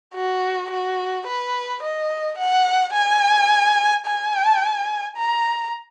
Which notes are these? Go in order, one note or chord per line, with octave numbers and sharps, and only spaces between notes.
F#4
F#4
B4
D#5
F#5
G#5
G#5
A#5